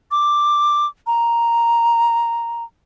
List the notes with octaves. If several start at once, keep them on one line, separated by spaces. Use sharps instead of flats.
D6
A#5